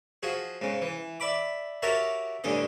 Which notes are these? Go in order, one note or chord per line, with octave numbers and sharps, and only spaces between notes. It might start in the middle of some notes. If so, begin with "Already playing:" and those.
F3 F#4 G#4
G#2 C#3
E3
D5 E5 B5 D6
F#4 G4 A#4 C#5 E5 A5
A1 G2 D3 C#4 D#5